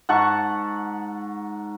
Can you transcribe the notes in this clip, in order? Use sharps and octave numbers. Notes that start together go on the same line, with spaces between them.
G#2 F#5 A5 C#6